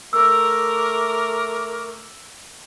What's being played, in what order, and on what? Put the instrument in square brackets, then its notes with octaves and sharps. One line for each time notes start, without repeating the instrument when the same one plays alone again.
[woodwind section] A3 D6 [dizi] A#4 [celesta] E6